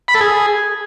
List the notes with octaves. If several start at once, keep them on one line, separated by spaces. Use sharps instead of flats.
B5
A4
G#4